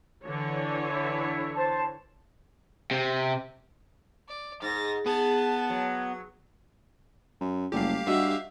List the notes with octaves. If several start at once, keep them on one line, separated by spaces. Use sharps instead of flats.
D3 E3 C#5
E4
C5 A5
C3
D5
G#2 A6 A#6
B3 G#4 A5
F#3
F#2
F#1 G3 A3 G4 F5
G2 F#4 D#5 E5 F#5